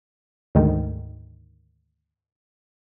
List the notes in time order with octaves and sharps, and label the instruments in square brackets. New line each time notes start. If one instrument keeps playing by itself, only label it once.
[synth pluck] D2 G#2 D#3